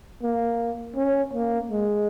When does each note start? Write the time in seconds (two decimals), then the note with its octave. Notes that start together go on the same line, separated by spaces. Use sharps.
0.22 A#3
0.96 C#4
1.33 A#3
1.70 G#3